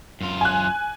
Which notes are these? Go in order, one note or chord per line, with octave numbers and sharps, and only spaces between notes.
F#2 F4
G#5 F#6